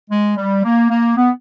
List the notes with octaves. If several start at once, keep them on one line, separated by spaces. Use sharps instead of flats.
G#3
G3
A#3
A#3
B3